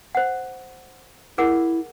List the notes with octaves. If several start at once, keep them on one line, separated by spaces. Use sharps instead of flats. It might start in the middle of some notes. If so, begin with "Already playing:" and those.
C5 F#5
E4 G#4 A#4 F#5